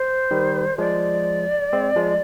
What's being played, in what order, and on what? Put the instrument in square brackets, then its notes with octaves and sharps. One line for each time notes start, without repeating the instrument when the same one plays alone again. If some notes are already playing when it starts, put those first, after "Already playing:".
Already playing: [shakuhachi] C5
[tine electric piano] D#3 G3
[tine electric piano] F3 G#3 [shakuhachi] D5
[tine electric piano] G#3 C4
F3 G#3